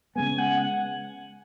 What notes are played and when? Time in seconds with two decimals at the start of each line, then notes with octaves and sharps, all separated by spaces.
0.15 C#3 G#3 B3 G#5
0.38 F#5
0.62 F#5